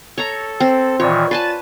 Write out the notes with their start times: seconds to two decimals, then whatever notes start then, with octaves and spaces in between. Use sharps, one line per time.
0.18 A4 C#5 A#5
0.60 C4
1.00 A#2 D#3 E3 F4 C#5 D5
1.31 B4 G#5 A5 A6